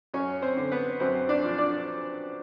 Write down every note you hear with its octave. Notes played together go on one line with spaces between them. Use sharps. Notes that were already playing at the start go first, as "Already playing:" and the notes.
F#2 C#4 C#5
C4 C5
D3
B3 B4
F#2 C4 C5
D4 D5
F3
D4 D5